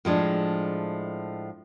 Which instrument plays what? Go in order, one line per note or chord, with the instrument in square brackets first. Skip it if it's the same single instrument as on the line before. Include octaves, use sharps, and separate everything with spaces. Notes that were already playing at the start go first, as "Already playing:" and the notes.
[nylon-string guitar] A2 F3 G#3 D4